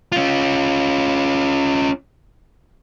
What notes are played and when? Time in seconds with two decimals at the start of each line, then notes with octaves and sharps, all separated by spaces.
0.12 C#4 F4